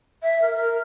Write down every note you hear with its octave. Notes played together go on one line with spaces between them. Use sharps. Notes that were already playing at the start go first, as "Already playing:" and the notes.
E5
A#4
A#4